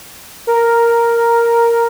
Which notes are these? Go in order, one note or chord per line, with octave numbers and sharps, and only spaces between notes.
A#4